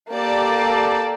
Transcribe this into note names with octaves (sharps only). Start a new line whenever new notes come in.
A#3 G4 A4 D5